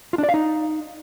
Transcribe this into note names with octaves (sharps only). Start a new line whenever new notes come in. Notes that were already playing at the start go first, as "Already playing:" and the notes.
F4
D4
D5
F5
D#4